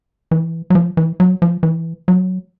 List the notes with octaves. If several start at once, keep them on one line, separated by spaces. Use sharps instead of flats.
E3
F#3
F3
E3
F#3
F3
E3
F#3